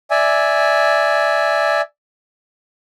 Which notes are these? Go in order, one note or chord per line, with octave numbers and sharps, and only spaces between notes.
D5 E5 G#5